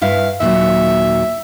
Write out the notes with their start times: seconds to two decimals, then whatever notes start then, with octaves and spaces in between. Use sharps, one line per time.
0.01 G2 E4 E5 F5
0.40 D#2 A#2 F#3 E5